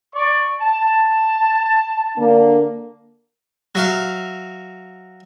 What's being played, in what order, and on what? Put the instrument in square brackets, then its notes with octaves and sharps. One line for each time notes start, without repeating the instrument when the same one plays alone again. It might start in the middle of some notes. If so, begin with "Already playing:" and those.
[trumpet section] D5 C#6
A5
[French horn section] D3 A#3 D4
[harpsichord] F#3 E5 F5